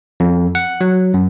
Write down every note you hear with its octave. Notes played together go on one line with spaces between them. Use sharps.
F2
F#5
F#3
F#2